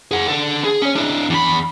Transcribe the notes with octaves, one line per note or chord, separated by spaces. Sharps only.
G#4 F#5
D3 A4
G#4
C#4 C#5
D4 E4
E2 B5